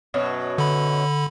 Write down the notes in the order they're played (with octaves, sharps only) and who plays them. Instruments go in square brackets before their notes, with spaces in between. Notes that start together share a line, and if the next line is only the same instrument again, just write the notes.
[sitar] F#2 B2 F#3
[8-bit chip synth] D3 B5